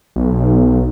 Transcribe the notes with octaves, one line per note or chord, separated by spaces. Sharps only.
B1